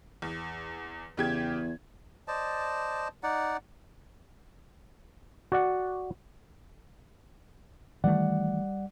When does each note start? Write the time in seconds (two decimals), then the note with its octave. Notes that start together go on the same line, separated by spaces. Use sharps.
0.22 E2
1.17 E2 C#3 G4 G#6
2.28 C5 D5 D#5 A5
3.23 D#4 D5 F#5
5.52 F#4 D5 F#5
8.04 D#3 E3 G3 A3 D5 F#5